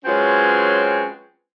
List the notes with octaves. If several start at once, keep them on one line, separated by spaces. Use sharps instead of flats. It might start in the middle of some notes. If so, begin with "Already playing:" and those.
F#3 G#3 C4 C#4 F4 B4